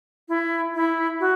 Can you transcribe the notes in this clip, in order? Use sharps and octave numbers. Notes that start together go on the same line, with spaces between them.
E4
E4
F#4